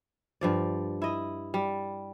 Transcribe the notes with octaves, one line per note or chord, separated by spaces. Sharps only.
G2 F3 D5
E4 D#5
G3